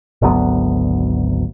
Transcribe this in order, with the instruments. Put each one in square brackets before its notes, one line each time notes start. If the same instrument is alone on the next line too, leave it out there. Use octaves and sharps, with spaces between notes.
[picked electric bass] G#1 D2 F#3 B3